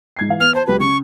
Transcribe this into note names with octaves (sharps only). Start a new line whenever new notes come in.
G#2 G#6 C7
E3 F5
B3 F6
C5 A5
C#2 F#3 G4 B4
C#3 C#6